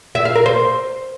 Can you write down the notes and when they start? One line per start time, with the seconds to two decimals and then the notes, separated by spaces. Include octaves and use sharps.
0.15 E5
0.25 F5
0.35 A#4
0.46 C5